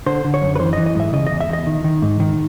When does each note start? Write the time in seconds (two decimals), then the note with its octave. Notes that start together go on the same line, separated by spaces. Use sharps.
0.06 D3 C5
0.25 D3
0.34 C#5
0.42 F#2
0.56 B4
0.60 E3 C5
0.73 D#5
0.77 E3
0.86 D#5
0.95 G#2 E5
1.13 C#3 D#5
1.27 E2 D#5
1.41 E5
1.49 E2 D#5
1.67 D#3
1.84 D#3
2.02 G#2
2.20 D#3